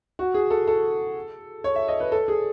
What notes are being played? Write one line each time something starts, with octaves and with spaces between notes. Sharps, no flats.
F#4
G#4
A4
A4
C#5
E5
D#5
B4
A4
G#4